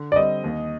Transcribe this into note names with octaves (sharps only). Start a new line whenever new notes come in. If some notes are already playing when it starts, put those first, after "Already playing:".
Already playing: D3
D5
G3 C4 D#5
D#2